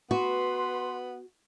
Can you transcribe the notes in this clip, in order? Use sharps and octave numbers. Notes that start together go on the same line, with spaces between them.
B3 F#4 B4 C6